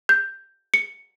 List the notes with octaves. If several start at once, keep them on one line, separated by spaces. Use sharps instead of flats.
G6
C#7